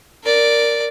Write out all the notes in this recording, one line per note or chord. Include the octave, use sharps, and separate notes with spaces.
A#4 D5